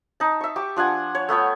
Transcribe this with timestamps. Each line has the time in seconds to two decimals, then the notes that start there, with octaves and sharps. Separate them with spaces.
0.20 D#4 A5
0.41 E5 C#6
0.56 G4 C#6 D6
0.76 F3 D4 F#5 G#5
1.15 C#5
1.28 A3 B3 C#5 G5